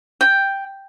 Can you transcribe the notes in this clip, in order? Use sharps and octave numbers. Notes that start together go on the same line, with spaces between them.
G5